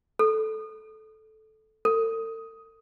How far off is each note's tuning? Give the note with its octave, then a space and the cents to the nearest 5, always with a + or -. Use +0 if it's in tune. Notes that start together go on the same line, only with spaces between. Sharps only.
A4 -10
A4 +40